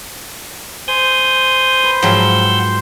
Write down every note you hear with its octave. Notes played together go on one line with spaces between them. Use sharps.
C5 G#5 D#6 G6
B4
G#2 F3 F#3 F#5 G5 E6 F6 G6